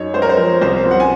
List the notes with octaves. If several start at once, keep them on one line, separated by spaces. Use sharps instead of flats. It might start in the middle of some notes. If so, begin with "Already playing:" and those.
Already playing: F#2 D#4 C#5
G#3 C5
A#4
C5
F3
C2 C5
C2
F#5
G#5